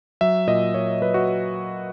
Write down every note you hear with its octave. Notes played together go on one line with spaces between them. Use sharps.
F#3 E5
A#2 D#5
A#2 C#5
F#3 B4
F#4